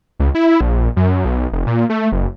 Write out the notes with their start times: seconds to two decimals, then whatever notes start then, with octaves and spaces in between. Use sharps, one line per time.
0.19 C#2
0.35 E4
0.61 A#1
0.96 F#2
1.25 B1
1.52 F1
1.67 A#2
1.90 A3
2.12 F#1